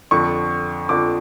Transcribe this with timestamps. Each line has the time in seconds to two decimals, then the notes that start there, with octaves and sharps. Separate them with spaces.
0.11 F2 D3 F3 C#6
0.89 F2 D3 F3 D6